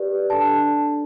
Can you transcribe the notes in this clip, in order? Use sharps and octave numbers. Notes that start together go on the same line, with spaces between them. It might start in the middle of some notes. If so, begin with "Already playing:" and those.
Already playing: G4 B4 D5
D4 A4 D5 A5